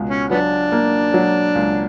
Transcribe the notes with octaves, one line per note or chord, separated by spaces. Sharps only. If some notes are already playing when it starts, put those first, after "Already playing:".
Already playing: C#2 B2
C#4
F#3 B3 D4
A#3
F#3
C#2